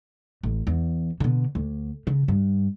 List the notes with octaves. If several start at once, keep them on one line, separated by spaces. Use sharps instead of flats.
A1
E2
B2 D3
D2
C#3
G2